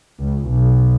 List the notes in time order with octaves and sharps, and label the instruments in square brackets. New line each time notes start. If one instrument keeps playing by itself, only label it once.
[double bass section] C#2
B1